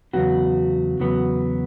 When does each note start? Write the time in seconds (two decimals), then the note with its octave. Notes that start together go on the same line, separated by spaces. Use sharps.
0.13 E2 C#3 F#3 B3 F#4
0.99 E2 C#3 F#3 B3